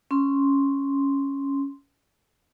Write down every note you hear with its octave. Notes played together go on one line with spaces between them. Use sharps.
C#4 C6